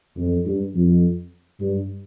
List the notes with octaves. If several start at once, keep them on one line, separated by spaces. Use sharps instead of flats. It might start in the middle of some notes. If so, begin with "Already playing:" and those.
F2
G2
F2
G2